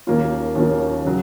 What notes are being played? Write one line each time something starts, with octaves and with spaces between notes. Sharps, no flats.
D#2 D#3 A#3 C#4 F4
D#2 D#3 A#3 C#4 F4
C#3 F#3